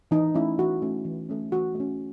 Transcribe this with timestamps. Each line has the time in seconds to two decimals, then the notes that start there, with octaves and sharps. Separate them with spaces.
0.11 E3 D#4
0.34 A3 C#4 E4
0.58 E3 F#4
0.82 A3 C#4
1.04 E3
1.29 A3 C#4
1.51 E3 F#4
1.75 A3
1.80 C#4